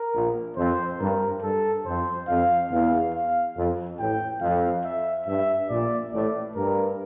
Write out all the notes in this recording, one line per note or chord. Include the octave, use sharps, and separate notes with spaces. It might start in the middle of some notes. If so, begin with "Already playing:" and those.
Already playing: A#4
A#1 A#2
F2 C5
G2 A#4
G2 A4
F2 C5
F2 F5
E2 F5
F5
F2
A1 A2 G5
F2 F5
E5
G2 E5
A#1 A#2 D5
A1 A2 D5
G2 A#4